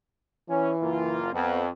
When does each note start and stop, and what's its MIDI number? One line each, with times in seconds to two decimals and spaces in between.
0.49 1.18 52
0.49 0.71 61
0.82 1.31 30
0.82 1.31 58
0.82 1.31 65
1.33 1.69 41
1.33 1.61 59